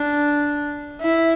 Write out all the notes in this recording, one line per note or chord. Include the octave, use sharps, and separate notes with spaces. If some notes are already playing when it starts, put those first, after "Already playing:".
Already playing: D4
E4